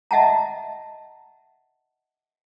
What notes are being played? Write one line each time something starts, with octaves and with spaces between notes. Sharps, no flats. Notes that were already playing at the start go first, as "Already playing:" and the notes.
D#5 E5 F#5 A5 A#5